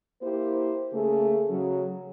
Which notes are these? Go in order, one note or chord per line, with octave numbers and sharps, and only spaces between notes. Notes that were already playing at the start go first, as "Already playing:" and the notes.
A#3 E4 G4 C5
C#3 A3 A#3 G#4
C#3 F#3